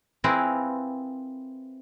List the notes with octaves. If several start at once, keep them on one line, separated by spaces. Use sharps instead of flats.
C4 E4 F4 G#4 A#4 B4